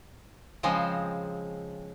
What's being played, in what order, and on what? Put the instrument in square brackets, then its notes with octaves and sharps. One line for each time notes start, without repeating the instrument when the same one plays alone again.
[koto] C#3 F3 G#3 C4